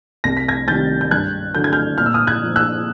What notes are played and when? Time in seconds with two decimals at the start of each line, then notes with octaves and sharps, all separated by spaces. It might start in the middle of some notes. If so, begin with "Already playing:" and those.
0.24 C2 A#6
0.37 B6
0.48 G#6 A#6
0.68 C3 D#3 G3 G6 A6
1.01 G6
1.11 G2 F#6 G#6
1.55 D3 F#3 G6
1.64 G#6
1.72 F6 G6
1.98 A#2 F6
2.06 E6
2.14 D#6 F6
2.27 F#6 G#6
2.42 F3 A#3
2.56 E6 F#6